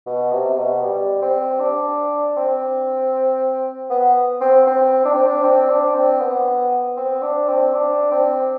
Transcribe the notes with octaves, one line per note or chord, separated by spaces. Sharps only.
B2
C3
C3
B2
G3
C4
D4
C4
B3
C4
C4
D4
C4
D4
C4
D4
C4
B3
C4
D4
C4
D4
C4